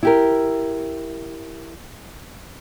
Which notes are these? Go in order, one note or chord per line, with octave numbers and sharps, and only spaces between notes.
E4 G4 A#4